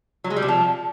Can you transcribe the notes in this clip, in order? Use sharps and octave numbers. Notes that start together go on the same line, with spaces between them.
F#3
G#3
G3
C3
F3